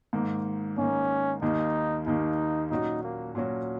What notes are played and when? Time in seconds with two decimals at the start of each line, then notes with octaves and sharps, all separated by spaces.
0.13 G#2 D#3 A#3
0.78 G#2 D#3 A#3 C#4
1.42 D#2 D#3 A#3 D#4
2.06 D#2 D#3 A#3 D#4
2.70 A#2 F#3 C#4 D#4 F#4
3.03 A#3
3.35 A#2 F#3 C#4 F#4